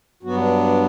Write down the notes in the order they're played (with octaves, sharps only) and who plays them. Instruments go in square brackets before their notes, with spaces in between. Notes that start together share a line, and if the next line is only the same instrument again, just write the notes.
[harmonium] G2 F#3 B3 F#4
D4